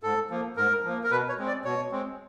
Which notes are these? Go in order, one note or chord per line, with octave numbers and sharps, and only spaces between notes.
G#2 A4
F3 A#3
G#2 A#4
F3 A#3
A#4
B2 B4
C#5
G#3 C4
D5
B2 C#5
G#3 C4